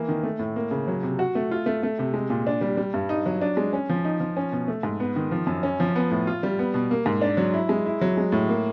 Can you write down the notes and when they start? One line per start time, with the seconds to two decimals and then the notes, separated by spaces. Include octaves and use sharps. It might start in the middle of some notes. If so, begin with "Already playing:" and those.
Already playing: E3 A#3
0.08 D#3
0.23 A3
0.39 A2
0.56 A#3
0.71 C#3
0.87 F#3
1.03 C3
1.19 F#4
1.35 A3
1.51 F4
1.66 A3
1.83 A3
1.99 C3
2.14 G#3
2.30 A#2
2.47 D4
2.61 G3
2.77 G3
2.94 G2
3.09 D#4
3.26 F#3
3.41 D4
3.57 G#3
3.73 C#4
3.89 F3
4.05 D#4
4.20 F3
4.37 C#4
4.52 B2
4.68 A3
4.83 G#2
5.00 B3
5.16 D#3
5.31 F3
5.47 F#2
5.63 C#4
5.80 F3
5.96 B3
6.11 A2
6.27 F4
6.43 G3
6.59 B3
6.74 B2
6.91 A#3
7.06 G#2
7.22 D4
7.37 F#3
7.54 E4
7.69 G#3
7.86 E4
8.01 F#3
8.17 G#3
8.32 A2
8.49 A#3